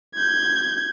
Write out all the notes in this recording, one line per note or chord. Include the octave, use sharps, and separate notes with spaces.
G6 G#6